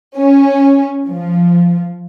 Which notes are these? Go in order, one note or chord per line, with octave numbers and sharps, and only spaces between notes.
C#4
F3